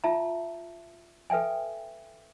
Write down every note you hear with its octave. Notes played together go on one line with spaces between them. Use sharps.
F4 E5 A5 A#5
A4 B4 E5 G5 G#5